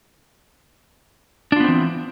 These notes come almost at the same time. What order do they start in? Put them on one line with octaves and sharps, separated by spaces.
D4 F4 B3 C4 E3